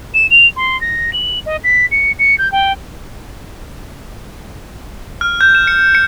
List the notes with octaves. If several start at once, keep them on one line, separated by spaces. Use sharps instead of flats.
E7
F7
C6
A#6
F#7
D#5
B6
C#7
C#7
G6
G5
F6
G6
E7
C#7
C#7